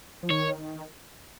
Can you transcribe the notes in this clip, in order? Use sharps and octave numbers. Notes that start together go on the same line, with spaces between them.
F3
D#3 C#5